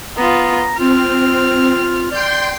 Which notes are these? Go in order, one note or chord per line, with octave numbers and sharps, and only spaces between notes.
B3 F4 A#5
C4 F4 F6
D5 G5 C6 G6